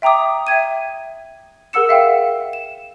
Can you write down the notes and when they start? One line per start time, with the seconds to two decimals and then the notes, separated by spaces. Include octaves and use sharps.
0.02 E5 G5 A#5 D6 D#6
0.47 E5 G5 G#6 D#7
1.73 G#4 A#4 F#5 E6 C#7 E7
1.89 E5 F5 G5
2.53 E7